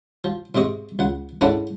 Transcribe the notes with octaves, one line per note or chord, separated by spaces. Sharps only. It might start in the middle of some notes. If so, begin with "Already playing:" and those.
F3
G#2 C3 C4 D#5 C#6
C#2 F#5
G#2 C#4 D4 E4 A4 F#5